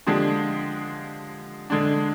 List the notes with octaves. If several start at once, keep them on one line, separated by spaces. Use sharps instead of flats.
D3 F3 G#3 D4 G4
D3 G#3 D4